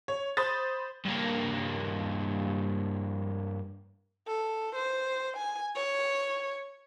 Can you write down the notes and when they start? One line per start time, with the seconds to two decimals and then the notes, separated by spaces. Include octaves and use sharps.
0.08 C#5
0.37 C5 B5 D#6 A6
1.05 G2 A#3
4.28 A4
4.75 C5
5.37 G#5
5.76 C#5